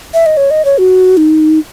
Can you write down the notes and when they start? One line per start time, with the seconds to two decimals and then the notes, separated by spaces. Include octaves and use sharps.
0.14 E5
0.26 D#5
0.37 C#5
0.51 D#5
0.65 C#5
0.78 F#4
1.17 D#4